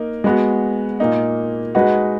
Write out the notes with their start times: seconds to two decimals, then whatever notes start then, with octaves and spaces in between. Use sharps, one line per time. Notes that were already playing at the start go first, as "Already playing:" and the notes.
Already playing: A#3 D#4 A#4
0.24 G#3 B3 F#4
1.00 A#2 A#3 D#4
1.75 G#3 D#4 F#4 B4